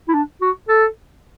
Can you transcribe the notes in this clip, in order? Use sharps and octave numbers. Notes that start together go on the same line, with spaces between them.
E4
D4
F#4
A4